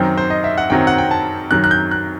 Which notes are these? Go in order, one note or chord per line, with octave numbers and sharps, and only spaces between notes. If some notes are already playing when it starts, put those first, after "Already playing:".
Already playing: F#2 D#3 F#3 C4 G5
C5
D#5
E5
F#5
F#2 D#3 F#3 C4 G5
F#5
G5
A5
F#2 D#3 F#3 F#6
F#6
G6
F#6